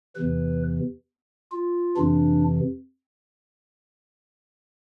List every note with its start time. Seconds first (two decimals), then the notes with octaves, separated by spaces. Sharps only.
0.15 E2 C3 E3 B4
1.51 F4
1.96 F2 C3 E3 D4